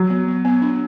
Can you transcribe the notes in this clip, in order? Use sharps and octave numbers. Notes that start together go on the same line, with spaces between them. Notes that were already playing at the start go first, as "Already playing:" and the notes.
Already playing: F#3
B3
B3
B3
D4